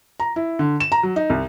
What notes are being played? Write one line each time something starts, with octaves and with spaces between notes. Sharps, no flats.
A#5
E4
D3
E7
A#5
F#3
D#4
C2